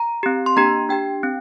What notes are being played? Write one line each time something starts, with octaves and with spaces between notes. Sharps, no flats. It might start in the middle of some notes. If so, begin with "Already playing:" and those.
Already playing: A#5
C4 G4
C6
A#3 D4 G4 A#5
D4 G4 G5
C4